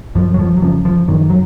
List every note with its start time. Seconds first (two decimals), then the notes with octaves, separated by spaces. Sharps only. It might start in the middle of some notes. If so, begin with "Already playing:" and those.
0.15 F#2 F3
0.34 F#3
0.39 F3
0.57 F#3
0.62 C#3 F3
0.85 F3
1.08 F#2 D#3
1.30 F#3